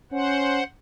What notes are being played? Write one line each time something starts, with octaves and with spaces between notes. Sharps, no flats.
C#4 C5 F#5